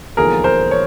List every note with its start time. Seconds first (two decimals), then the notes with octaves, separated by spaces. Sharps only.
0.17 E1 D#2 D3 F3 G#4 A#4
0.44 A#4 C5
0.71 C#5